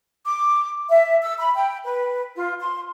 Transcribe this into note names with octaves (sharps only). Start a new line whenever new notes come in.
D6
E5
E6
B5
G5
B4
F4
C6